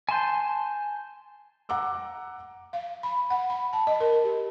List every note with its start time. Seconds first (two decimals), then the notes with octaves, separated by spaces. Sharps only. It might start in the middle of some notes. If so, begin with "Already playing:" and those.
0.09 G#5 A5 C6 G6
1.69 F#5 A#5 D6 E6
2.73 F5
3.03 B5
3.30 F#5
3.50 B5
3.73 A5
3.87 D#5
4.00 A#4
4.24 G4